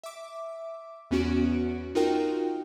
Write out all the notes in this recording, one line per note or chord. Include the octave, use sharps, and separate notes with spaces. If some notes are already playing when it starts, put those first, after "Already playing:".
E5 D6
E2 B3 C#4 F#4 D7
D#4 F4 F#4 A#4 G5